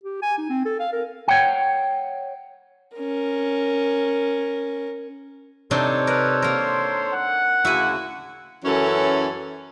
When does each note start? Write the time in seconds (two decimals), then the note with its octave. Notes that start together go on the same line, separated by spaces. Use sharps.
0.04 G4
0.22 G#5
0.38 D#4
0.50 C4
0.65 A4
0.80 F5
0.93 A#4
1.28 C#5 F#5 G5
2.96 C#4 A#4
5.71 C3 D4 D#4 A4 C5 C#5
6.07 A#4 B4
6.42 A#3 A#4 C6
7.13 F#5
7.65 D2 C#3 E4 F#4 G#5
8.64 F#2 E3 C#4 A4 C#5